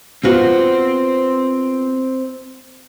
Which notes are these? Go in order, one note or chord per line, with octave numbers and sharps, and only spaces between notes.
B3 C4 F4 F#4 C5